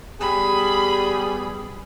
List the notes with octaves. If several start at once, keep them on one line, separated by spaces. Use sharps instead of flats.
G3 B3 G#4 B5